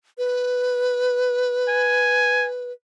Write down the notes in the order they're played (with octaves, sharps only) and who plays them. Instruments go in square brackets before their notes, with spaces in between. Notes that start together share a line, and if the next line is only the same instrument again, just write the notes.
[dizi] B4
[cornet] G#5